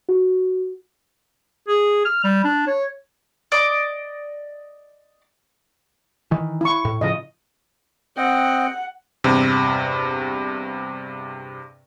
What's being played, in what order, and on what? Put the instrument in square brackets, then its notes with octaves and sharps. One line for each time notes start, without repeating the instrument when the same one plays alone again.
[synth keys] F#4
[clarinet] G#4
F6
G3
D4
C#5
[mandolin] D5 D#5 D6
[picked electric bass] D#3 E3
[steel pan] E4 C#6
[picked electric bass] A2
[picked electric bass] A2 C#3 F3 [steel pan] D#5
[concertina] C4 D#5 G5 [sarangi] F#5
[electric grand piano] E2 G2 C3